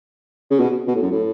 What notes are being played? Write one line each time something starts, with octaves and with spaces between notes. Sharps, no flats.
C#3
B2
B2
A2
F#2
A2